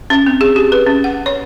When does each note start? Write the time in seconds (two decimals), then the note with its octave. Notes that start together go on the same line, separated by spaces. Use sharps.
0.10 C#4
0.26 C4
0.41 G#4
0.56 G4
0.72 B4
0.87 C#4
1.04 F#5
1.26 C#5